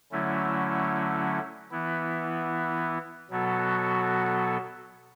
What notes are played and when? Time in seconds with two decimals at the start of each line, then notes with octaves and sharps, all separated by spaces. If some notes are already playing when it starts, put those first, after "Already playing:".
0.12 D3 F#3 A3 C#4 E4
1.71 E3 B3 E4
3.30 B2 F#3 B3 F#4 A4